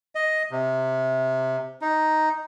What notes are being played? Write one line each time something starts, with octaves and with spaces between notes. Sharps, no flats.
D#5
C3
D#4